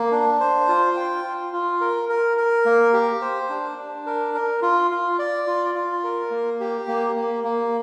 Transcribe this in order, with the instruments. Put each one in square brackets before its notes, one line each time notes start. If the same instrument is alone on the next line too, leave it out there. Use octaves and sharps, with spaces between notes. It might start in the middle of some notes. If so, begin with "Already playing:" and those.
Already playing: [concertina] A#3
D4
C5
F4
G5
F4
F4
A#4
A#4
A#4
A#3
G4
C5
D4
D4
A#4
A#4
F4
F4
D5
F4
F4
A#4
A#3
G4
A#3
A#3
A#3